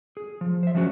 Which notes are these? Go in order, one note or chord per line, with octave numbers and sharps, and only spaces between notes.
G#4
F3
C5 E5
F3 F#3 G#3 C#4 D4 F#4